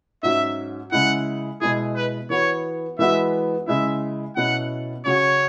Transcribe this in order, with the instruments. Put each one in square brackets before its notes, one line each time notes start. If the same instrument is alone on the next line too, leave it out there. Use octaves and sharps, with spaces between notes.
[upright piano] G#2 F#3 C#4 [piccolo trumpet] E5
[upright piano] C#3 G#3 E4 [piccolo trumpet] F#5
[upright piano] B2 G#3 E4 [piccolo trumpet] G#4
[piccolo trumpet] B4
[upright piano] E3 B3 F#4 [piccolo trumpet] C#5
[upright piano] E3 G#3 B3 F#4 [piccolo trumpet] E5
[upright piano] C#3 G#3 E4 [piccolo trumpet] E5
[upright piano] B2 F#3 C#4 E4 [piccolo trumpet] F#5
[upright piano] C#3 F#3 C#4 F#4 [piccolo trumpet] C#5